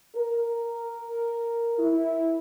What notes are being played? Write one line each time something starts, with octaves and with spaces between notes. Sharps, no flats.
A#4
E4